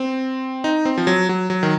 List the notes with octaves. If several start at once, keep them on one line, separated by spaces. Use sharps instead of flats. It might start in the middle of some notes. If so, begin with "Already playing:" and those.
Already playing: C4
D#4
C4
F3
F#3
F#3
F#3
D#3